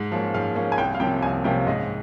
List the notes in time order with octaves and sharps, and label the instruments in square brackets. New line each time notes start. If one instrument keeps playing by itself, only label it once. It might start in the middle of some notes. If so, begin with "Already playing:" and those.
Already playing: [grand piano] G#2
F3 A#3 C#4
[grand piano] G#2 [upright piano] F5
[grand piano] F3 A#3 C#4
[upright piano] G#5
[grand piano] C2 [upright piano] G5
[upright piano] F5
[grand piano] C3 F3 A#3 C#4 [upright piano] G5
[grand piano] C2 [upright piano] G#5
[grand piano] C3 F3 A#3 C#4 [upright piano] G5
[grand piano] G#2 [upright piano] D#5